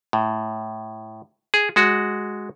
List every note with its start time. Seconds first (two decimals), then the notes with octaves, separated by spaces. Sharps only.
0.13 A2
1.54 G#4
1.76 G#3 F#4